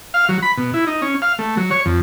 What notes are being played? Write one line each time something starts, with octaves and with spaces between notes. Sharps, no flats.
F5
F#3
B5
B2
E4
D#4
C#4
F5
A3
F#3
C#5
F2